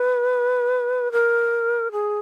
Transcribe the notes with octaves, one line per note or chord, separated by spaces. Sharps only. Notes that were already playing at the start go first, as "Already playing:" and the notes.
Already playing: B4
A#4
G#4